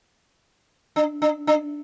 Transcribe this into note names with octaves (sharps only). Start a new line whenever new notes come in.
D4
D4
D4